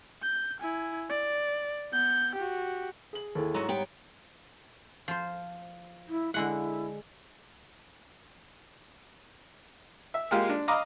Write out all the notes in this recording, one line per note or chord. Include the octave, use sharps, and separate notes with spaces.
G6
E4 G#5
D5
B3 G6
F#4 G4
G#4 F#7
D#2 E4 G#4 A4
G#2 F#3 F#4 A#5 D#7
G3 B3 C#5 G5
F3 C5
E4
D3 G#3 E4 F#5
E5
G#3 A#3 F4 G4 G#4 F5
D4
D#5 F5 A#5 B5 D6 D#6